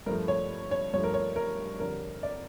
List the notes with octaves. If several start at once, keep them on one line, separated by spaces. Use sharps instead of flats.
G2 F3 A3 A#4
C#5
C#5
G2 F3 A3 C#5
A#4
C#5
A#4
F2 D3 G3 A#4
D5